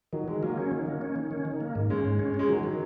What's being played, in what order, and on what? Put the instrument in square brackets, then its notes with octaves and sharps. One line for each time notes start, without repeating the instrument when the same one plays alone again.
[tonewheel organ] D#3 [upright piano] F#3
[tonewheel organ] D#3 [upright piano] G#3
[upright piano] F#3 [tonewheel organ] A#3
[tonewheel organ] C#4
D#3
A#3
C#4
D#3
C#4
D#3
A#3
G#2
[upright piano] G#3 [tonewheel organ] C#4
[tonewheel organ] G#2
C#4
[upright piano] G#3 [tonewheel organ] C#4
[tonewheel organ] D#3 [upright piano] F#3
[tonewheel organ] D#3